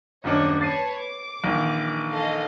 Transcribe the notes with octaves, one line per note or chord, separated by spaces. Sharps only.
D#1 F#2 D4 C#5 D#5
B4 C#5 A5 A6 C7 D#7
D6
A#1 D#3 E3
A4 D#5 F5